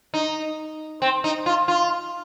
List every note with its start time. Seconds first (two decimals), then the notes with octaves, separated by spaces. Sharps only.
0.14 D#4
1.02 C4
1.24 D#4
1.46 F4
1.68 F4